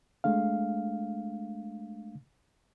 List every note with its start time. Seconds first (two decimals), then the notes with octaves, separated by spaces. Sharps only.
0.24 G#3 A3 D4 F5